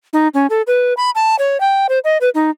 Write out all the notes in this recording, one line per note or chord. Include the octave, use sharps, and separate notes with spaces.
D#4
C#4
A4
B4
B5
A5
C#5
G5
C5
D#5
B4
D#4